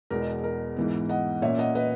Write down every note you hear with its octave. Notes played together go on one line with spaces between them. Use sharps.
E2 B2 G#3 B3 A#4
A#4
G#2 E3 B3
D#5 F#5
A#2 A#3 C#4 C#5 E5
D#5 F#5
B4 D#5